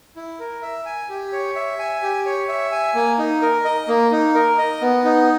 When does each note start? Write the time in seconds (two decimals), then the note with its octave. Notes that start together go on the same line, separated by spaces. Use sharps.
0.16 E4
0.39 A#4
0.62 E5
0.86 G#5
1.09 G4
1.32 C#5
1.56 E5
1.79 G#5
2.03 G4
2.26 C#5
2.49 E5
2.71 G#5
2.95 A#3
3.18 D#4
3.42 A#4
3.65 D#5
3.88 A#3
4.11 D#4
4.35 A#4
4.58 D#5
4.81 B3
5.04 D#4